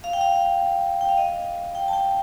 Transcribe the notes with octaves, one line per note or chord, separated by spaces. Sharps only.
F5
G5
F5
G5
F5
D#5
G5
A5
G5